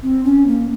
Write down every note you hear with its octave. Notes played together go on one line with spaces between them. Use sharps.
C4
C#4
A#3